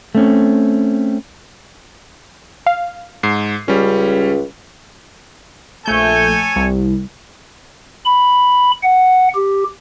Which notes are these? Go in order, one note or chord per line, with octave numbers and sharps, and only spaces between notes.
A3 C4 C#4
F5
G#2 C7
C#2 G3 C#4
A#1 A3 A4 C#5 G#5 G6
C2
B5
F#5
G4